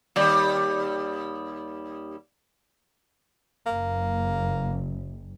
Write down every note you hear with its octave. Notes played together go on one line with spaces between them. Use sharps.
D#2 G3
F#1 A#3